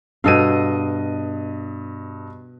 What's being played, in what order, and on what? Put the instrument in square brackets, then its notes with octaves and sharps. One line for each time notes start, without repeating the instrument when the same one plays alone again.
[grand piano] G2 D#5 D#7 [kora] B2 A4 F5